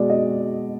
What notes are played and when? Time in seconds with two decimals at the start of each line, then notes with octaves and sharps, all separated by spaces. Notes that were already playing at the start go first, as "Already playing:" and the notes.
Already playing: B2 G#3 D5
0.09 D#5